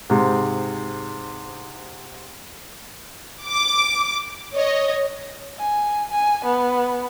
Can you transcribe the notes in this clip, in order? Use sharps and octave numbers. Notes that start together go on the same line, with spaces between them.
G#2 C3
D6
C#5 D#5
G#5
G#5
B3